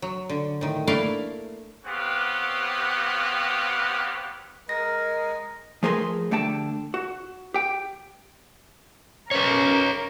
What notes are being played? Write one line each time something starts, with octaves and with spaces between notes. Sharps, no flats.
F#3
D3
A2 D#3
A3 A#3 D4 E4 A#4 F5
B3 C4 G4 C#5 F5 F#5
G#3 A#4 A#6
F3 A3 G#4 A#4 B4 C6
D3 A3 G4 G5 A5
F#4
G4 G5
C#4 A#4 B4 C#5